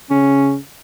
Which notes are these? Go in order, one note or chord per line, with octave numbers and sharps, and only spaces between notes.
C#3 C#4